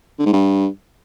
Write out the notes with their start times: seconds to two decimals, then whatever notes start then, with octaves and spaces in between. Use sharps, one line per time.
0.19 D3
0.26 G#2
0.33 G2